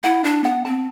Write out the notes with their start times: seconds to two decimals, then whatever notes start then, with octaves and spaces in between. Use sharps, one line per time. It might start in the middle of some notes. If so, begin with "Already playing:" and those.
0.03 E4 F#5
0.24 D4 D5
0.44 B3 F#5
0.65 C4 A5